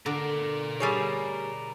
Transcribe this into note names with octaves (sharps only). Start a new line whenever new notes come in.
D3 A#4 D5
G3 G#4 C#5